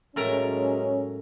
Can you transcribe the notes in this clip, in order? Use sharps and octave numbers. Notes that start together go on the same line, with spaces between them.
A2 F#3 G#3 C#4 A#4 A#5